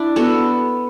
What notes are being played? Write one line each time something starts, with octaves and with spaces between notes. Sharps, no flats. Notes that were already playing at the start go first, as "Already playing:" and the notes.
Already playing: D4 E4
B3 F#4 A4